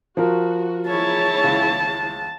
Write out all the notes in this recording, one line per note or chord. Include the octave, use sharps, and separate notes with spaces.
F3 F#4 A#4
E4 G#4 C#5 A5
C#2